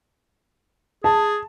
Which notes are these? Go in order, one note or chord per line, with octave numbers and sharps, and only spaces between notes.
G#4 A5